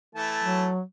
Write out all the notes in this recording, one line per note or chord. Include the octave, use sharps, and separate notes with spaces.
E3 A3 A5
F#3